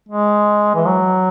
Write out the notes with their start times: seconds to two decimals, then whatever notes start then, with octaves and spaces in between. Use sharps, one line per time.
0.09 G#3
0.75 E3
0.87 F#3